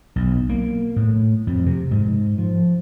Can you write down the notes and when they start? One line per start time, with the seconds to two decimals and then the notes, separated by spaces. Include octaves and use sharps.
0.16 B1
0.49 A#3
0.96 A2
1.47 F2
1.66 C3
1.91 G#2
2.38 F3